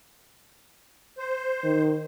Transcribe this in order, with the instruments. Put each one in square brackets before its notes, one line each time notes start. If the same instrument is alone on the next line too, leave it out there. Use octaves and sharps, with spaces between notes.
[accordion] C5
[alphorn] D#3